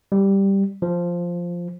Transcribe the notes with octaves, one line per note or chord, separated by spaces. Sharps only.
G3
F3